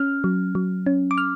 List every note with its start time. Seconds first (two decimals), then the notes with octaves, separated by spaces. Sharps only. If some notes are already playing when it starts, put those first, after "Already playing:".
Already playing: C#4 F6
0.24 F#3
0.55 F#3
0.86 C#4
1.11 D6
1.18 F6